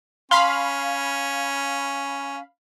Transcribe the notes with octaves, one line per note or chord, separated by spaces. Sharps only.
C#4 F5 B5 C6